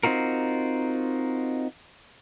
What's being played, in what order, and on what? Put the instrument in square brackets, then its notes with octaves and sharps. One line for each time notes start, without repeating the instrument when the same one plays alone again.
[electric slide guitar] C4 D#4 F4 F#4 A#4